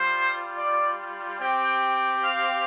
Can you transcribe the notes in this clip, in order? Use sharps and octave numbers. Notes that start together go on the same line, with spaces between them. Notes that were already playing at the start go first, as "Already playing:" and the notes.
Already playing: G3 F4 C5
D5
C4 G4 G5
F5